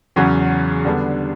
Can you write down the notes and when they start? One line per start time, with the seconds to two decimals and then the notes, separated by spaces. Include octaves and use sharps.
0.16 E2 C#3 F#3 C#4 F#4
0.85 D3 G3 B3 D4